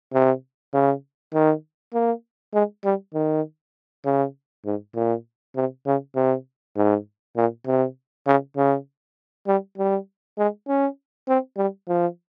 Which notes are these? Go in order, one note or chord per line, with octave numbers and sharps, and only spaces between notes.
C3
C#3
D#3
A#3
G#3
G3
D#3
C#3
G#2
A#2
C3
C#3
C3
G#2
A#2
C3
C#3
C#3
G3
G3
G#3
C#4
C4
G3
F3